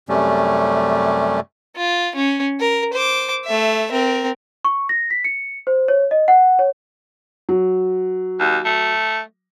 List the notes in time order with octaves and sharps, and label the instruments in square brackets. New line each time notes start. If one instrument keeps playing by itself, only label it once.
[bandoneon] F#2 C3 G3 A3 C#4
[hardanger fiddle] F4
C#4
A#4
C5 D6
A3 E5
C4 A#4
[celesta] C#6
A#6
B6
C#7
C5
C#5
D#5
F#5
C#5
[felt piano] F#3
[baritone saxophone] D#2
A3